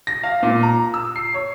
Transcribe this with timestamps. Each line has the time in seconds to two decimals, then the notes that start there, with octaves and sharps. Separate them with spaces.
0.07 A#6
0.23 F5
0.43 A#2
0.63 A#5
0.94 E6
1.16 C7
1.34 C#5